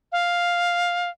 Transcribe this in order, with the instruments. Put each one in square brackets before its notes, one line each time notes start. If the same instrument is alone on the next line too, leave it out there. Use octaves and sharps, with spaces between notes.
[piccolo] F5